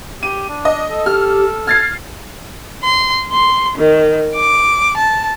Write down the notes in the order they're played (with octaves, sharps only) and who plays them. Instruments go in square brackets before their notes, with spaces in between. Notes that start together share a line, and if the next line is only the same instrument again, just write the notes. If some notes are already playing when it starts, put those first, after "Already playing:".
[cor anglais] G4 [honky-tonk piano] D#7
[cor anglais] D4
[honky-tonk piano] D#5
[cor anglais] A4
[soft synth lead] G4 [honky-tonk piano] F6
[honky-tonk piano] F6 A6 C7 [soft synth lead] G#6
[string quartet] C6
C6
D#3
D6
A5